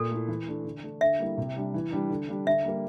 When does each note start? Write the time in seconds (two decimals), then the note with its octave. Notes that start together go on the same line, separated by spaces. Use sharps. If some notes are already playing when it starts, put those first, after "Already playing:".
Already playing: A#2 A4
0.11 A3 E4
0.28 E3
0.47 A3 D4
0.64 D3
0.83 A3 D4
1.01 D3 E5
1.19 G3 A#3 E4
1.37 C3
1.56 G3 D4
1.74 E3
1.92 G3 D4
2.10 D3
2.29 G3 D4
2.47 D3 E5
2.65 G3 A#3